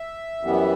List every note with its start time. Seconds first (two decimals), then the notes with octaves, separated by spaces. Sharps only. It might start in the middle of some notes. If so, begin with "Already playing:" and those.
Already playing: E5
0.41 F#2 E3 G3 B3